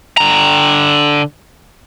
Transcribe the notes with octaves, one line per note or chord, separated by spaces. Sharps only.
D3 A#5